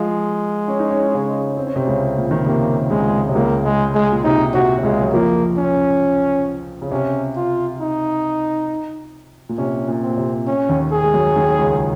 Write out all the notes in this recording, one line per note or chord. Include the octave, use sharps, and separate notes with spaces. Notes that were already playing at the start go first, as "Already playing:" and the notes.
Already playing: F3 G#3 F4
C#4
D#4
C#4
D#4
C#3 C#4
C4
C#4
C3 C4
C#2 C#3
A#2
D#3
C#3
C3 A#3
C#2 C#3 G#3
C3
C#2 C#3 A#3
G#3
G#3
A#2
C3 D#4
C3 F#4
C3
C#2 C#3 G#3
F#3
F2 F3 A#3
C#4
C#3
C3 C#4
F4
D#4
A#2
C3 C#4
A#2
C4
A#2
C3
C#4
D#2 D#3
G#4
G#3
F#2 F#3
D#2 D#3
C#2 C#3